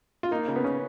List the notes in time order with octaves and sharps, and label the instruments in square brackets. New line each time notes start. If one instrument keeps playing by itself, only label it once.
[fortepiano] F4
[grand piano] A#3 [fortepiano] D#4
[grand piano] C#3
[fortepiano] B3
[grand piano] C#3 [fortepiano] C#4